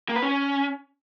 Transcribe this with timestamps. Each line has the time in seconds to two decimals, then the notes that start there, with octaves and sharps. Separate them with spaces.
0.09 A#3
0.16 B4
0.22 C#4